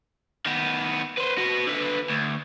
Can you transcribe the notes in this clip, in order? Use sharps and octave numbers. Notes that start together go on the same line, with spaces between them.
D#3 B3
B4 C5
F#4 B4
D3 B4
D2